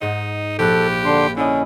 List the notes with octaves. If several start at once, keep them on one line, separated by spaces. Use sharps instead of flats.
G#2 D#4
A#1 G4 A4 F#6
D3 D4 C6
D3 C#4 E4 D#5